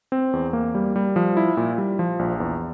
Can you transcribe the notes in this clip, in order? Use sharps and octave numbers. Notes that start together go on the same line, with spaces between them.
C4
E2
A#3
G3
G3
F3
E4
A#2
G3
F3
A#1
E2